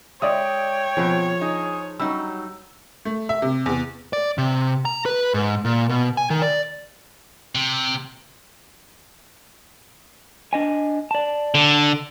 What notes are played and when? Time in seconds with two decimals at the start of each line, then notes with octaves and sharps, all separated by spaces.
0.22 G#3 C#5 D5 E5 G5 D#6
0.97 B2 F3 C4 G#4
1.41 D#4 G#4
2.00 F#3 G3 C#4 D#4 E6
3.05 A3
3.29 E5
3.42 C3
3.66 E2
4.13 D5
4.38 C3
4.85 A#5
5.06 B4
5.34 G#2
5.65 A#2
5.89 B2
6.17 G#5
6.30 D#3
6.42 D5
7.55 C3
10.53 D4 D#5 G#5
11.11 D5 A5
11.55 D3